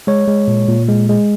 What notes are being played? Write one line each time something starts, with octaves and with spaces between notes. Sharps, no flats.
G#3 C#5
G#3
A#2
A#2
G#3
G#3